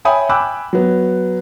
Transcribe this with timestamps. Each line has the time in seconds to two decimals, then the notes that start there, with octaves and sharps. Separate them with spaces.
0.05 C#5 E5 G5 G#5 B5 D#6
0.29 G5 G#5 B5 D6 E6 F#6
0.73 F#3 B3